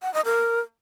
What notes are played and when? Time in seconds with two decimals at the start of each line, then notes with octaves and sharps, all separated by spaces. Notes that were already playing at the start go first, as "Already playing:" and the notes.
0.02 F#5
0.14 D#5
0.25 A#4